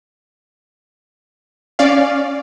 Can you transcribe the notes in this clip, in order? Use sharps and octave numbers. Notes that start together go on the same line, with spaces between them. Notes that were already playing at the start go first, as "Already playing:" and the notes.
C#4 D5 F5